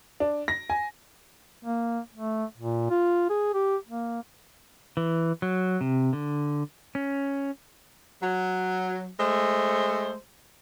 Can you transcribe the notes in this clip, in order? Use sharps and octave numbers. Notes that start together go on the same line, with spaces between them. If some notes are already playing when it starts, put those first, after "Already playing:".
D4
A#6
G#5
A#3
A3
A#2
F4
G#4
G4
A#3
E3
F#3
C3
D3
C#4
F#3
G#3 A3 C5